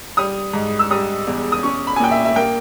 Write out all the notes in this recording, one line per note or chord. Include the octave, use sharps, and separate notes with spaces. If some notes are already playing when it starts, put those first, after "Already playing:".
G3 D#6
G#2
E6
G3 D#6
E2
D#6
C#4 C#6
B5
G#5
A#2 G5
E5
E5
A#3 G5